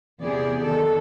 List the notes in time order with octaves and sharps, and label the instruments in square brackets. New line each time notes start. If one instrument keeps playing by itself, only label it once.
[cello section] E2 C3 B3 G4 G#4 D5
D#3 A4